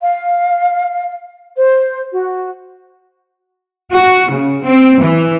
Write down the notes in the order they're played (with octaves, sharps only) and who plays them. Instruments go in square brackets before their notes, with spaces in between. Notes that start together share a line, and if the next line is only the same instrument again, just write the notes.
[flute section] F5
C5
F#4
[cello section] F#4
C#3
C4
E3